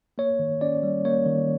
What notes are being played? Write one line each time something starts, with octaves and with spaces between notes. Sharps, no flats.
A#3 C#5
D#3
C#4 D5
G3
A#3 C#5
D#3